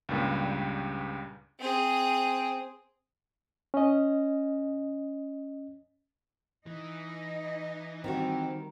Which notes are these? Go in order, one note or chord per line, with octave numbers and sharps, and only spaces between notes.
C#2 G2 A#2 G3
C4 G#4
C#4 D#5
E3 D#4 D#5
D#3 G3 C4 F#4